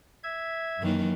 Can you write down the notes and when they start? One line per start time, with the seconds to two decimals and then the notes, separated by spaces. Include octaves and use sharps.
0.23 E5 G#6
0.82 F#2 D#3 E3 A#3